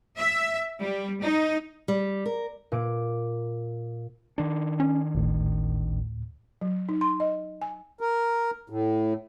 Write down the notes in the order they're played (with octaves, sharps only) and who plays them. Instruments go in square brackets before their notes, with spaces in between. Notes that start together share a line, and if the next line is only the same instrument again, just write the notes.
[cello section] E5
G3
D#4
[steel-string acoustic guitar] G3
A#4
[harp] A#2 D6 D7
[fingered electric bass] D#3 D4
[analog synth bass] C#4
[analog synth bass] G#1 [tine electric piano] D2 A2
[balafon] F#3
D#4
C6
D#5
G#5
[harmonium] A#4
A2